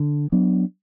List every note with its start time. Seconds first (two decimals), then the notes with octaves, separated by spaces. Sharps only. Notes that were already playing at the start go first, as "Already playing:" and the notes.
Already playing: D3
0.32 F#3 B3 D4